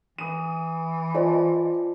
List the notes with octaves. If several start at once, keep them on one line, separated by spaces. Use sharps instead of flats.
E3 D#6 D#7
F4 C5 D5 D#5 A5